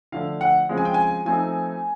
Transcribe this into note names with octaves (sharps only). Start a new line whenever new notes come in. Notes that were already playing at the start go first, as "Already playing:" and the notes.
D3 F3 A3 D4 F5
F#5
C#3 F3 G#3 C4
G#5
G5
G#5
F3 A3 C4 D#4 G#5